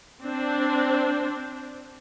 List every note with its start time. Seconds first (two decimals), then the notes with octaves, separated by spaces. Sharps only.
0.23 C4 D4